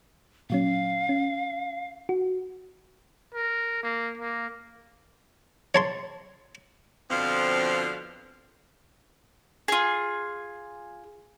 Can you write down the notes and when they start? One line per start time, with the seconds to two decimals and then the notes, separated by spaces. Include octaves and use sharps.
0.50 A#2 F#3 C#4 F5
1.09 C#4
2.09 F#4
3.34 A#4
3.83 A#3
4.18 A#3
5.75 C#5 A5 C6
7.10 F2 B2 D3 F3 C4 F5
9.68 F4 G#4